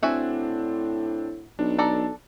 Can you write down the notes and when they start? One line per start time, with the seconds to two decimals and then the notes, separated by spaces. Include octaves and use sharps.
0.03 A2 C4 D4 F#4 E5 G#5
1.59 B1 D4
1.78 A4 D5 A#5